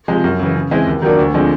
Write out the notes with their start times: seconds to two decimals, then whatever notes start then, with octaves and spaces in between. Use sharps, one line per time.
0.08 C3 F3 G#3
0.24 F#2
0.40 C#3 E3
0.55 C#3
0.71 E3 G#3 C4 E4
0.86 D#2
1.02 D#3 F#3 A#3 D4
1.18 D2
1.34 D3 F3 G#3 C4